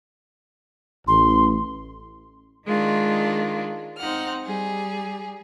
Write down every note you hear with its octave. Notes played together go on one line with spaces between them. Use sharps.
A1 C6
D#3 G#3 D4 F4
C4 D#4 F#5 F6
G3 G#4